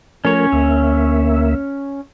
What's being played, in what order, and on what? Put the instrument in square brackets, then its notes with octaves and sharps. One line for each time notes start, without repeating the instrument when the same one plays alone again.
[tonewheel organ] F3 A3 A#4 [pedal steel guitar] C#4 C#5
[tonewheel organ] D2 A#3 E5